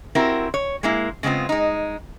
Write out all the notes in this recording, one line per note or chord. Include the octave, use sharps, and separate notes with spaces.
C4 E4 F#4 G4 A#4
C#5
G#3 A#3 E4
C#3 G#3 B3 C4 F4
G#3 D#4